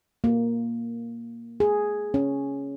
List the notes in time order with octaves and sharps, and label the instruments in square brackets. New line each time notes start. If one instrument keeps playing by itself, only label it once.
[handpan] A#3
G#4
C#4